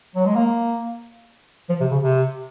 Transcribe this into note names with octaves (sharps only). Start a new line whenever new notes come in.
F#3
G#3
A#3
F3
C3
C#3
C3